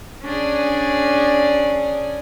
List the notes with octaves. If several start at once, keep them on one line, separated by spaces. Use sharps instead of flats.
C#4 D4 G#4 D5